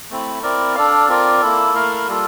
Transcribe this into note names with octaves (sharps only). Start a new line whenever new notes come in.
A3 C4 E4
C4 E4 A#4 D5
D4 A4 D5 F5
C4 F4 A#4 D5
A#3 E4 A4
A3 E4 A#4 F5
G3 A#3 F4 A4